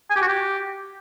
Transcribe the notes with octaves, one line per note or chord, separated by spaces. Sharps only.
G#5
G4
F#4
G4